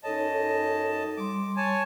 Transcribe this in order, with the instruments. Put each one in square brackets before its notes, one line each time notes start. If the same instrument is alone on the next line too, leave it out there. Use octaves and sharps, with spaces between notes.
[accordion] F#2 D#5 A5 [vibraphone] D#4 A4 C#5
[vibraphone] G3 C6 [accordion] D6
[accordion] C#5 G#5 A5